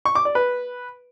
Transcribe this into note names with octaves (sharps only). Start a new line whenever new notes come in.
C#6
D6
D5
B4